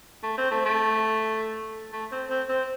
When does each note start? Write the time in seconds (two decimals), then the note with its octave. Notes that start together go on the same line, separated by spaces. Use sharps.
0.23 A3
0.38 C4
0.51 A3
0.65 A3
1.93 A3
2.12 C4
2.30 C4
2.49 C4